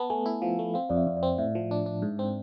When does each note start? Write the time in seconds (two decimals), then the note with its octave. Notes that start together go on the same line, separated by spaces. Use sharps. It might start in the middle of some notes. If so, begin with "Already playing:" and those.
Already playing: B3 A5
0.10 A3 G#5
0.26 E4
0.42 F3 F5
0.59 A3
0.74 C4 F5
0.89 F2 D5
0.96 E5
1.07 F2
1.17 D5
1.23 C4
1.38 A2 E5
1.55 F3
1.71 D4
1.86 D4
2.02 G#2
2.19 C4